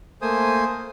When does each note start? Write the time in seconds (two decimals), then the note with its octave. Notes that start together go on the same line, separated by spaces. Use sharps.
0.22 A3 A#3 C5 G#5 D#6